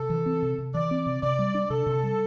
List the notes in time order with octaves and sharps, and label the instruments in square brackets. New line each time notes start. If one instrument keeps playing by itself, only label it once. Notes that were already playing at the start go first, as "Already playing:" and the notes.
Already playing: [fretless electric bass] C3 [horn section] A4
[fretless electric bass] E3
C4
C3
C3
[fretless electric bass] E3 [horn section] D5
[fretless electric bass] C4
C3
[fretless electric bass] C3 [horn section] D5
[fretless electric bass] G3
D4
[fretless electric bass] C3 [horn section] A4
[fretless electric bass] C3
G3